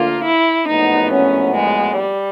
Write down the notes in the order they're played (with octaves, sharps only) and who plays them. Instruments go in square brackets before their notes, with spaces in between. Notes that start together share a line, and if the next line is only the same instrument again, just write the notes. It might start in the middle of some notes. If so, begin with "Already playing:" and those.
Already playing: [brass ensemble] D2 D3 F3 A#3 [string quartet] F4
[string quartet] E4
[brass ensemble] A#1 A2 F#3 B3 [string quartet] D#4
[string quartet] C#4
G#3
G3